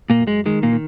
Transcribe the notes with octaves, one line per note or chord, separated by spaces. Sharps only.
A#2 A#3
F#2
G#3
D#3 G#3
A#2 A#3
D#3